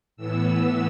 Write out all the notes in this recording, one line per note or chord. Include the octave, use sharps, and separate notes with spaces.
A2 E3 B3 E6